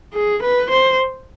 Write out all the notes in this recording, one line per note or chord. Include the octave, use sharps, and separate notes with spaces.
G#4
B4
C5